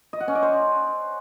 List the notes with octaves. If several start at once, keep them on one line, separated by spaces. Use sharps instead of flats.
D#5
F#5
C#4
D5
C5